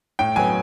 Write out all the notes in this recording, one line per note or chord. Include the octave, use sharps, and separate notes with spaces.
A2 G5
F#3 B3 G#5